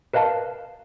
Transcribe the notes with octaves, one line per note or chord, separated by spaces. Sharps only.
A#4 B4 D#5 F5 A5